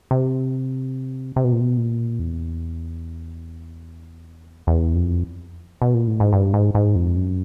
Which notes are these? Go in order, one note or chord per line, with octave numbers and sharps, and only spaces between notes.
C3
C3
B2
A#2
B2
A#2
E2
E2
F2
B2
A#2
A2
G#2
G2
G#2
G#2
F2
F#2